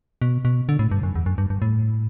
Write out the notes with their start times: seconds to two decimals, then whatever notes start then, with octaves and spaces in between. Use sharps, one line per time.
0.22 B2
0.45 B2
0.69 D3
0.79 A2
0.91 G2
1.03 F#2
1.15 E2
1.26 F#2
1.38 G2
1.50 G2
1.62 A2